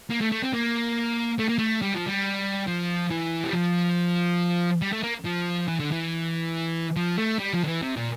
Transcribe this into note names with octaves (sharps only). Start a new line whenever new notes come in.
A#3
A3
A3
C4
A#3
A3
A#3
A3
G3
F3
G3
F3
E3
G3
F3
G3
A3
A#3
F3
E3
D3
E3
F3
A3
G3
F3
D3
E3
C3
A#2